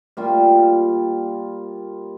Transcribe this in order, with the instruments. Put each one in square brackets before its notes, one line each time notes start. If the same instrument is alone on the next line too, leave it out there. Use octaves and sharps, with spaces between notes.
[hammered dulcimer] G3 A#3 F4